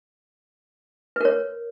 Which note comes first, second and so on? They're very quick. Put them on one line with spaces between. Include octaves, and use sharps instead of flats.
B4 A#4 C#5